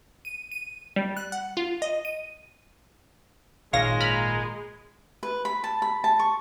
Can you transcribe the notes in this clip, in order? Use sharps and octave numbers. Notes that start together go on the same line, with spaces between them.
D#7
D#7
G3
F#6
F#5
F4
D#5
D#7
G#1 A#2 G#3 C#5 F5 A#6
A#5 B5 F6
B4
B5
A5
B5
A5
C#6